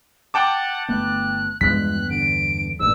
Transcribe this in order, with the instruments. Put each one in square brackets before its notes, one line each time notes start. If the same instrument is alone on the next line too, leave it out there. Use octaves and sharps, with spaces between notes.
[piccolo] F#5 [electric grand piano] G5 A5 D6
[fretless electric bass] G1 A3 B3 [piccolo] F#6
[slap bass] E2 G2 B3 [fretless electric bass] F3 G#3 [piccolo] F#6 [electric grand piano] B6
[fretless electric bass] D3 [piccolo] D7
[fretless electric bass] A1 A#2 [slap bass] G2 [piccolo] E6